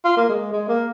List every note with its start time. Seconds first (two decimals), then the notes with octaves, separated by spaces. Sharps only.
0.05 F4
0.17 A#3
0.29 G#3
0.53 G#3
0.69 A#3